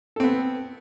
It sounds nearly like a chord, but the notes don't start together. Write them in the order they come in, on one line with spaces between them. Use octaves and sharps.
A4 C4 B3